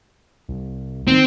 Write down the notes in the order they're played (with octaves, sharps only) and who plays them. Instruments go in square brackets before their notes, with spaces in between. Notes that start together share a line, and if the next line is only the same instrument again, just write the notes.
[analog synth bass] C2
[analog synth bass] D#3 [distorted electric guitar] C4